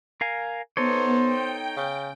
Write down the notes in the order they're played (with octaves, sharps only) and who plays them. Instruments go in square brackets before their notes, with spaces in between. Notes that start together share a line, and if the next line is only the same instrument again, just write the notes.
[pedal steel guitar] A#4 F5 G#5
[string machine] B3 [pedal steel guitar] D#4 A4 C#5 [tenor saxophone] C5
[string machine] G5
[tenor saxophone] C#3